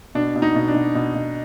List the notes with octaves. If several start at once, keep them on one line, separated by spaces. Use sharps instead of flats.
B2 D4
B2
D#4
B2
D4
B2
B2
B2